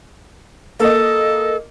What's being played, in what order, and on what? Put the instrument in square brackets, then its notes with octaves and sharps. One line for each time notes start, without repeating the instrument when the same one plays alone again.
[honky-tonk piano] A#3 D#5 [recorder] A4